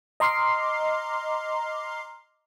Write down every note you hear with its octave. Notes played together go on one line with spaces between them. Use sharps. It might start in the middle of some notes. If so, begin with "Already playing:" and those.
D#5 A#5 C6 D6 F6 C7